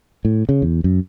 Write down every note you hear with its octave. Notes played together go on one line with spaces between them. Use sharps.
A2
C#3
E2
F#2